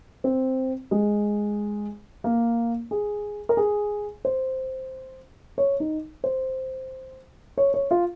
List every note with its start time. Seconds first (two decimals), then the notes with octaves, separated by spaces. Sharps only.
0.24 C4
0.91 G#3
2.24 A#3
2.91 G#4
3.49 A#4
3.57 G#4
4.25 C5
5.58 C#5
5.80 D#4
6.24 C5
7.58 C#5
7.74 C#5
7.91 F4